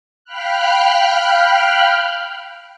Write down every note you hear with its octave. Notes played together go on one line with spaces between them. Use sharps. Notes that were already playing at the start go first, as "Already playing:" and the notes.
F5 G5 B5 F6 F#6